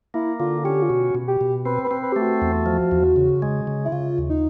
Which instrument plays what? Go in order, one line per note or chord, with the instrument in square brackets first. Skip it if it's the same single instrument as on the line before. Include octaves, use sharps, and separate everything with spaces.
[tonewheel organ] A#3 [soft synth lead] E4
[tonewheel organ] D3 [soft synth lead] F4
[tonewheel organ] C#4 [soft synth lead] G4
[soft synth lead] F4
[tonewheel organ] B2 [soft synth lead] F#4
[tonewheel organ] B2
[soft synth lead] G4
[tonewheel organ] B2
[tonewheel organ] C4 [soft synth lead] B4
[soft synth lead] B4
[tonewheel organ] C4
[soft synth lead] B4
[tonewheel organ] A3 [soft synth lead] G4
[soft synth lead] F#4
[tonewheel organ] E2
F3
E2
C#3
G#3
C#3
[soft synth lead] E4
[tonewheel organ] C#3 [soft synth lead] F4
[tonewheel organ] D#2
[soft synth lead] D#4